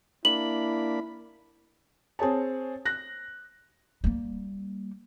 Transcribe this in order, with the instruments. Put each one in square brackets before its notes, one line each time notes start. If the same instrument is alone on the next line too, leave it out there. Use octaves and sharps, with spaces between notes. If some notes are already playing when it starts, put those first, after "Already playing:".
[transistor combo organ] A#3 D4 B5 [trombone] E4 [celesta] F#7
[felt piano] C4 G#4 C#5 A5
F#6 A#6
[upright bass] G3 A#3